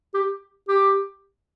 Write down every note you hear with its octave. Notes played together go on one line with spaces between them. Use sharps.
G4
G4